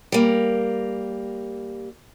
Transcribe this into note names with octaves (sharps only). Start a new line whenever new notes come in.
G3 A#3